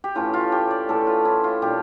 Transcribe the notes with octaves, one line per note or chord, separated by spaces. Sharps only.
G4
A2 E3 A3 C#4 F4
F4
G4
D5
A2 E3 A3 C#4 A4
F4
E4
F4
A#2 G3 D4 G4